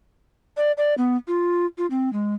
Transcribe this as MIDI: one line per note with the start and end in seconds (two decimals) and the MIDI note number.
0.57 0.72 74
0.77 0.94 74
0.98 1.17 59
1.28 1.66 65
1.78 1.86 65
1.90 2.12 60
2.13 2.34 56